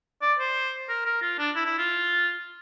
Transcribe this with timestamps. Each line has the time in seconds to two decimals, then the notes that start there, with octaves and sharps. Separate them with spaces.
0.22 D5
0.39 C5
0.89 A#4
1.06 A#4
1.22 F4
1.39 D4
1.56 E4
1.66 E4
1.78 F4